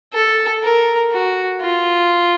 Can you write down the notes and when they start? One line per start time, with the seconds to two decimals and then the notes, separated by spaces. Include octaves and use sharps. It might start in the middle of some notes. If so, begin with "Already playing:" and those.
0.14 A4
0.63 A#4
1.12 F#4
1.61 F4